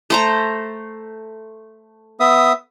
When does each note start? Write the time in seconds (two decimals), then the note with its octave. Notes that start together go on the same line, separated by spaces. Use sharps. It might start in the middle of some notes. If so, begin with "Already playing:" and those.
0.10 A3 C5 A#5
2.20 B3 E5 D#6